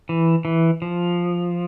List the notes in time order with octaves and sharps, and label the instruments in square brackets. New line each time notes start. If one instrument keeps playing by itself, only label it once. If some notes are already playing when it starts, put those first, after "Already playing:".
[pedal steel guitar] E3
E3
F3